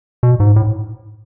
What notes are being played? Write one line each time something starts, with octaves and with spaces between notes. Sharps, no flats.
B2
G#2
A2